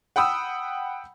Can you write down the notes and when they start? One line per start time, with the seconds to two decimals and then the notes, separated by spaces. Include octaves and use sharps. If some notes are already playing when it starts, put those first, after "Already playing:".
0.16 F#5 G5 B5 D#6 E6